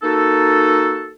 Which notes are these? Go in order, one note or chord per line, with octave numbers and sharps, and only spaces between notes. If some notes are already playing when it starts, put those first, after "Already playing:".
A#3 D#4 F#4 A4